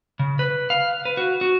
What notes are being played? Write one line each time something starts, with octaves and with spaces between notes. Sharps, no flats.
C#3
B4
F5
B4
F#4
F#4